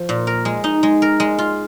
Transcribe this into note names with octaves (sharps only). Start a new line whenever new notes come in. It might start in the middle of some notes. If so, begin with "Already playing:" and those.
Already playing: F3
A#2
A#4
G#3
D#4
G#3
A#4
G#3
F4